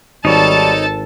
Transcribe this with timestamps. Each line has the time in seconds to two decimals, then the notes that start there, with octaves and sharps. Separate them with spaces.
0.25 G#1 G3 D#4 A4 C#5 A5